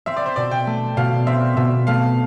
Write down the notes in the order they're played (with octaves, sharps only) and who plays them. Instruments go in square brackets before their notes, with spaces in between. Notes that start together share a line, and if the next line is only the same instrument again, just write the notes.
[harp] C4 [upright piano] E5
[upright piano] D5
C5
[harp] B2 [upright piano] D5
[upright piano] G5
[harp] A3
[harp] B2 [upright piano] F5
[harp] C4 [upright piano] E5
[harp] B2 [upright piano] E5
[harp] A3 [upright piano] F5